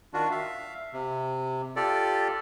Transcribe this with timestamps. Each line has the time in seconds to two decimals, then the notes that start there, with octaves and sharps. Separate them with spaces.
0.14 D#3 D4 F4 F#4
0.31 E5 F5
0.93 C3
1.76 F4 G4 A4 D5